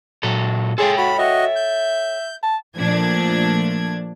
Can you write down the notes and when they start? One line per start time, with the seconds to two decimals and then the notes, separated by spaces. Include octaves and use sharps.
0.23 A#2 F#3 A4
0.78 G#4 A4 C#5 G5 C6
0.98 F#4 B5
1.19 F#4 D#5 E5
1.56 G6
2.43 A5
2.77 A#2 F3 A3 D4 G#6